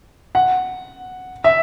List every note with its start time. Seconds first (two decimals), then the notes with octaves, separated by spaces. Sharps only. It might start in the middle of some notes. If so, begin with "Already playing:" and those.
0.35 F#5
1.44 E5